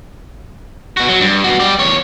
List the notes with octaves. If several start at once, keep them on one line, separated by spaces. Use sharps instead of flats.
B2 F#4
F#3
G2
B3 F#4
G3 D5
E2 C#5